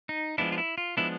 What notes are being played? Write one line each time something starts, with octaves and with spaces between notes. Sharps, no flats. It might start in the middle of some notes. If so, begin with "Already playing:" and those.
D#4
F3 G#3 B3 D4 E4
F4
E4
F4
F3 G#3 B3 D4 E4